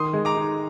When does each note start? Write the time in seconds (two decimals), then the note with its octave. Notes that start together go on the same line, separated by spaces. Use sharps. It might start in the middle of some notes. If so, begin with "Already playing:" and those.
Already playing: D#3 C6 D#6
0.13 G#3
0.25 A#5 D6
0.36 D#4